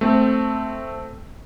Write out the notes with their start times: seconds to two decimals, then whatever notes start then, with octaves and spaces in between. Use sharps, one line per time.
0.01 A3 C4